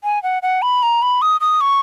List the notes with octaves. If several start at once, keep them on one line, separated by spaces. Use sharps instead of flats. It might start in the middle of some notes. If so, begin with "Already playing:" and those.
G#5
F#5
F#5
B5
A#5
B5
D#6
D#6
C#6